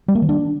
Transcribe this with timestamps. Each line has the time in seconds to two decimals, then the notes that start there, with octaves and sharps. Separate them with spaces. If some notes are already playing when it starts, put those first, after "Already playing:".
0.08 G3
0.15 A#3
0.22 D#3
0.29 D4